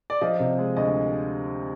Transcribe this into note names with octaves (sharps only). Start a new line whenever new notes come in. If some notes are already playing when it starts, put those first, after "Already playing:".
D5
F3 D#5
C3
G#3
D2 D#5